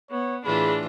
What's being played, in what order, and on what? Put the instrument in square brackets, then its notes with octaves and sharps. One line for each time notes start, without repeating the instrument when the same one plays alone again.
[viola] B3 [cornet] C#5
[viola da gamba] A2 E3 F4 [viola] D4 [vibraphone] G#4 [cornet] B5